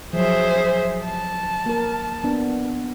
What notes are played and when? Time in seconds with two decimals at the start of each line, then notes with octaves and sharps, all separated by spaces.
0.13 F3 F#3 G#4 C5 E5
1.04 A5
1.66 A#3 A#4
2.24 B3 D4